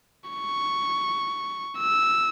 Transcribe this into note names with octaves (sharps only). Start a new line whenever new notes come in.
C#6
E6